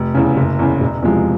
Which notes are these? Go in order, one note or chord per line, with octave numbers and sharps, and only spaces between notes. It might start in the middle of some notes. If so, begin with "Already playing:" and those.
Already playing: F1
E2 C#3
F#1
E2 C#3
E1
E2 C3 F3 G#3